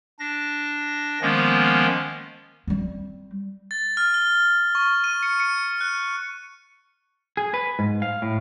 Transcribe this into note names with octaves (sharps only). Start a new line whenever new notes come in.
D4 A#6
D#3 F3 G#3 A#3 B3 C#4
G3 C4
A6
F6
G7
C#6
D#7
C#7
C#7
F#6
G#4
B4
G#2
F5
A2